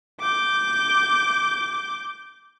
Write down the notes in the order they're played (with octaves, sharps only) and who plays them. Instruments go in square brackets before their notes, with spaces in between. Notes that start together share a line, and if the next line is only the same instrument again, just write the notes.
[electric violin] D6 G6